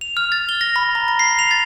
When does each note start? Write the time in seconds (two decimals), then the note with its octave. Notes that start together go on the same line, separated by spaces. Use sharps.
0.01 F7
0.17 F6
0.32 A6
0.49 G7
0.61 A#6
0.76 B5
0.95 A#5
1.08 A#6
1.19 C7
1.39 F7
1.51 A6